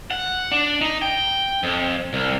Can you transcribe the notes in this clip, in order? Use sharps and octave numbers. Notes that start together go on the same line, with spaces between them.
F#5
D4
D#4
G5
F2
C2